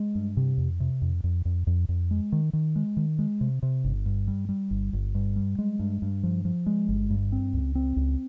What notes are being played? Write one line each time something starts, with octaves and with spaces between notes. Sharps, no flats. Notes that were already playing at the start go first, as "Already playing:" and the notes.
Already playing: G#3
G2
C3
F2
C3
F2
F2
F2
F2
F2
G#3
D#3
D#3
G#3
D#3
G#3
C3
C3
G1
G2
G3
G3
G1
G1
G2
G3
G#3
G2
G2
F3
F3
G#3
G1
G2
C4
C#2
C4
C#2